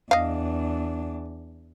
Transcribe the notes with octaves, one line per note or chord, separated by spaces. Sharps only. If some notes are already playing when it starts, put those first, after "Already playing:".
E2 D4 D#5 F5